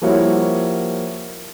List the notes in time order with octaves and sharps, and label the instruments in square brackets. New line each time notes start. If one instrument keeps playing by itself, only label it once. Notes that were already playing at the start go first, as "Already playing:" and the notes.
[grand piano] F3 G3 A#3 E4 F#4 C#5